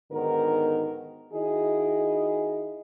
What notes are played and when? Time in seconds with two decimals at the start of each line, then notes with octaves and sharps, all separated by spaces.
0.12 G#2 D3 D#3 B3 F#4 A#4
1.33 D#3 E4 F#4 G#4 D#5